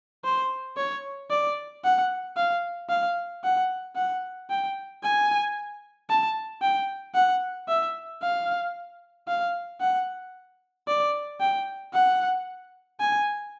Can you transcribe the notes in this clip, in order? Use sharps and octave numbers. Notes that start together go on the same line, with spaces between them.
C5
C#5
D5
F#5
F5
F5
F#5
F#5
G5
G#5
A5
G5
F#5
E5
F5
F5
F#5
D5
G5
F#5
G#5